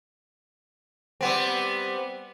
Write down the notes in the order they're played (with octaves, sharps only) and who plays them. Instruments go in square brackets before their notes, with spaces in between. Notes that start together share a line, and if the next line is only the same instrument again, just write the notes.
[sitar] G3 B3 C4